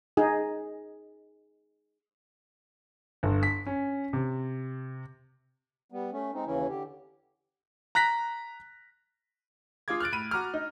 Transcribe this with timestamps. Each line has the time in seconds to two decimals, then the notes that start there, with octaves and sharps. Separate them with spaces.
0.17 D#4 G#4
3.23 G1
3.43 B6
3.67 C#4
4.13 C3
5.92 G3 B3
6.12 A3 C#4
6.34 G#3 C4 D#4
6.46 D#2 C#3 E3 C#4 E4
6.69 D3 G4
7.95 A#5 F#6 A#6 B6
9.88 F4 G#4 F5 D6 G#6
10.00 F6 F#6 A6 D7
10.12 A2 B5 D#7
10.31 F#4 A#5 B5 D6 F6
10.54 D#4